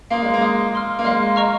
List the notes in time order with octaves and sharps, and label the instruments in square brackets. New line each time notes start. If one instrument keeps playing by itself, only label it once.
[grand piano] A#3 [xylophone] F5 C6 D#6
[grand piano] G#3
A#3
[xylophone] F5 C6 D#6
F5 C6 F6
[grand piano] A#3
[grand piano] G#3 [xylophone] F5 C6 F6
[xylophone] D#5 A#5 C#6 F6